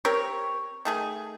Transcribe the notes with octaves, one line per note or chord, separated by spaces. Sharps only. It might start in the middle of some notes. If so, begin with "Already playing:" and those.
C4 G4 A#4 C#5
D#3 A3 G#4